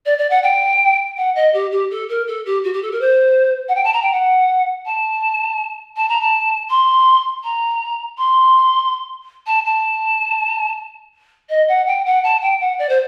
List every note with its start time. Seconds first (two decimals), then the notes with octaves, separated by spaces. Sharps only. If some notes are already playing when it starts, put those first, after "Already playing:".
0.06 D5
0.18 D5
0.30 F#5
0.43 G5
1.17 F#5
1.35 D#5
1.53 G4
1.71 G4
1.91 A4
2.09 A#4
2.27 A4
2.45 G4
2.64 F#4
2.73 G4
2.82 A4
2.91 A#4
3.01 C5
3.68 F#5
3.75 G5
3.84 A5
3.93 A#5
4.02 G5
4.12 F#5
4.86 A5
5.96 A5
6.08 A#5
6.21 A5
6.70 C6
7.43 A#5
8.17 C6
9.46 A5
9.65 A5
11.49 D#5
11.68 F#5
11.87 G5
12.05 F#5
12.24 A5
12.41 G5
12.60 F#5
12.79 D5
12.89 C5